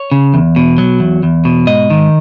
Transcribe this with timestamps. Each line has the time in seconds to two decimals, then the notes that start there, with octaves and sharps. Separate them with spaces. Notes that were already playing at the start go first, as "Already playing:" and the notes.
Already playing: C#5
0.12 C#3
0.34 E2
0.56 B2
0.78 F#3
1.00 E2
1.23 E2
1.45 B2
1.67 G#2 D#5
1.90 D#3